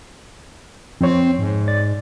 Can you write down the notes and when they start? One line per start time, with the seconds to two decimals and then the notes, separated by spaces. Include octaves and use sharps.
1.01 F2 C4 C#5
1.39 G#2
1.68 D5 A6